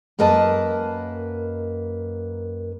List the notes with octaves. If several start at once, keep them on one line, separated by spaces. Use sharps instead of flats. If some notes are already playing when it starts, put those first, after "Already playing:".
F#2 A#3 A#4 B4 D#5 A5